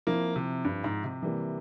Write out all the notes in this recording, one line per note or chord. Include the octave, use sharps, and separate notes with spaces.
F3 A#3 C4 E4
C3
G2
G#2
C3
E3 G3 A#3